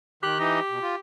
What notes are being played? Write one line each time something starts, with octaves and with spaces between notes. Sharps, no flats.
D#3 G4 F#6
E3 D#4 D#5
B2
F4